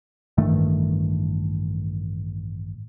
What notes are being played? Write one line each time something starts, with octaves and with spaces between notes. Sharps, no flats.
A1 G2 D#3 A3